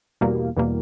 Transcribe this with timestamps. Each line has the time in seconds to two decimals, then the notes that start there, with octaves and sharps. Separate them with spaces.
0.21 E2 B2 G3 A#3
0.57 E2 B2 G3 A#3